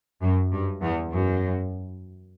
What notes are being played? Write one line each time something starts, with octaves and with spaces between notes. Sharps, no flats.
F#2
G2
E2
F#2